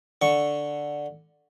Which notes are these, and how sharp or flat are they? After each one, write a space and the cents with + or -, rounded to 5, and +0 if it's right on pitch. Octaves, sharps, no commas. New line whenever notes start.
D3 +0 C#6 +0